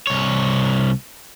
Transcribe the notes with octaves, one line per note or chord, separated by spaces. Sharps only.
C2 C#5